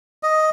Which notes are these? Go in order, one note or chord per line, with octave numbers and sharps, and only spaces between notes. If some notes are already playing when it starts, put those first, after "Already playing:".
D#5